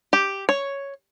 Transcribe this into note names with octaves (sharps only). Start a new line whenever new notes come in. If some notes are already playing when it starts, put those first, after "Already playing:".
G4
C#5